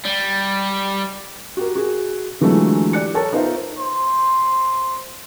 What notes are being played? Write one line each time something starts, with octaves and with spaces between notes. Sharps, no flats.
G3
F#4 G4 A#4
F#4 G#4
D3 E3 F#3 G#3 A3 F4
G4 D5 F#6 C#7
A4 A#4 C#5 G5 A5
B3 D#4 F4 A#4 C5 E5
C5